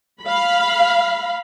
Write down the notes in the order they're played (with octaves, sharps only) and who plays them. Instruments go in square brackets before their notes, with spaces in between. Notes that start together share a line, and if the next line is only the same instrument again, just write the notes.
[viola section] F5 B5